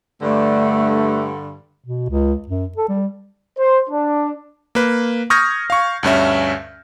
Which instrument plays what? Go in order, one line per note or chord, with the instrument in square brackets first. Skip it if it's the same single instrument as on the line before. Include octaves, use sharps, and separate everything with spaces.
[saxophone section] G2 D3 [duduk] A3
[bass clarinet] B2
C#2
F#2
A4
G3
[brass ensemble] C5
D4
[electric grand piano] A#3 B4
C#6 D#6 F6 G6 G#6 A#6
F5 C#6
D2 G2 C#4 E5